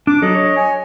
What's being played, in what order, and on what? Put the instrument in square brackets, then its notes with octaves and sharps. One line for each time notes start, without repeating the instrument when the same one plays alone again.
[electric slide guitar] D4 [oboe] D6
[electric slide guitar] F#3 A4 [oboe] D#5
[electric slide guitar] C#5
[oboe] G#5